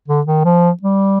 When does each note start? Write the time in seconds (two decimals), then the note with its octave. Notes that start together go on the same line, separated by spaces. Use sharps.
0.08 D3
0.27 D#3
0.45 F3
0.83 G3